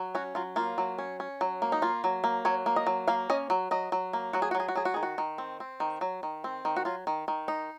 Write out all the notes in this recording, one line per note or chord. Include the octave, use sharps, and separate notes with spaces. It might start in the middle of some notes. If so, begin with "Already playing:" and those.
Already playing: F#3
C#4 F#4
F#3 F4
A#3 F4
F#3
C#4
C#4
F#3
A#3
D#4
A#3 F4
F#3
A#3
F#3 C#5
A#3
D#5
F#3
A#3 F5
C#4 D#5
F#3
F#3 D#5
F#3
A#3
F#3 F#4
G#4
F#4
F#3
G#4
F#4
F#3 G#4
F#4
D#3 G#4
F#4
D#3
C4
C4
D#3
F#3
D#3
C4
D#3
F#4
F#3 F4
D#3
D#3
D#4